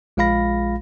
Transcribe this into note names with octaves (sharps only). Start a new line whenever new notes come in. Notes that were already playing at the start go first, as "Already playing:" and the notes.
A#1 G#3 F4 F5 B5 A#6